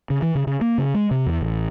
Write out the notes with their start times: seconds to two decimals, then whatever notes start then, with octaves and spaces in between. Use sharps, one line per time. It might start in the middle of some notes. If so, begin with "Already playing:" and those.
0.10 C#3
0.22 E3
0.35 C#3
0.47 C#3
0.61 A#3
0.78 C#3
0.94 G#3
1.11 C3
1.26 E2
1.41 A1